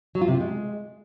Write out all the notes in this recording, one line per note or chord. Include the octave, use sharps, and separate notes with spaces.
F#3
F4
C3
F4
G#3